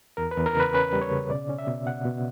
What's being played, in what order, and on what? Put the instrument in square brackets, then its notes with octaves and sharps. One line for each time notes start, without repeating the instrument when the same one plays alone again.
[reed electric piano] E2 A#4
B4
E2
A#4
C#3
B4
C#4 B4
G3
C#5
C#3
B2 D5
C#4
E5
B2
B2 F#5
B2